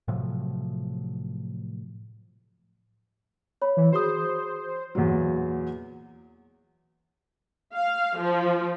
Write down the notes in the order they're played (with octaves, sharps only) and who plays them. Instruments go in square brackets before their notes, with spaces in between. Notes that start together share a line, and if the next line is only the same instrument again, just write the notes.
[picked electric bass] A2 C3 F3 F#3
[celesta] C#5 B5
[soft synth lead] E3
[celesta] F#4 G#4 D#6 [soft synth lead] C5
[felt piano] E2 A#2 F#3
[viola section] F5
F3